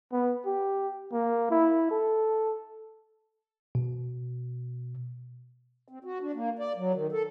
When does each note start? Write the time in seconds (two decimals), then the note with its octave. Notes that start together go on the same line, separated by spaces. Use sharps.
0.12 B3
0.46 G4
1.13 A#3
1.50 E4
1.91 A4
3.75 B2
5.88 C4
6.04 F#4
6.21 D4
6.34 A#3
6.59 D5
6.77 F#3
6.94 D#3
7.12 A4